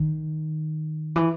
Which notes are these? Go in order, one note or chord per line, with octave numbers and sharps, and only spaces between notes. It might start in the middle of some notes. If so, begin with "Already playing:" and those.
Already playing: D#3
E3